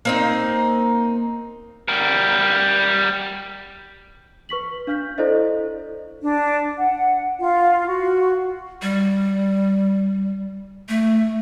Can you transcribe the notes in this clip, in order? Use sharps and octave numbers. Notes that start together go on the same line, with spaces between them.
A#3 C4 D#4
G3 A#4
B4 C#6 B6 F#7
D4 F5 F6 G6 B6
E4 A4 C5 D5 D#5 F5
D4
F#5
F4
F#4
G3
A3